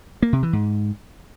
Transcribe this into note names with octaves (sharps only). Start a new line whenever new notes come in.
A#3
C3
E3
G#2